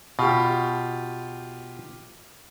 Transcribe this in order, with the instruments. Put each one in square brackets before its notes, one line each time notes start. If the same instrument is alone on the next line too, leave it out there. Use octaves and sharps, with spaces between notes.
[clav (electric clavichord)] B2 [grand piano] F4 G4